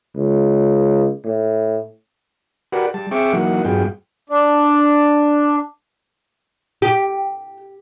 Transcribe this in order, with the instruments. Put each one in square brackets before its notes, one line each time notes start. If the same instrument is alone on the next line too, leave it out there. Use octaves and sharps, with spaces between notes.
[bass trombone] C#2
A2
[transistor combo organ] F#4 G4 A#4 B4 D5 F#5
G3 A5
C4 G#4 E5 G5 C#6 D6
E3 F#3 A#3 D#4 F#5
G2 F#3 B3 F4 G#4 G5
[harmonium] D4
[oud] G4